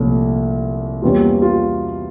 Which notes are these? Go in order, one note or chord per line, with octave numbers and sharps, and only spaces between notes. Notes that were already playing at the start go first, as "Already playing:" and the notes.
Already playing: C2 A#2 F3 A3 C#4
E2 B2 G3 A#3 C#4 F4
F4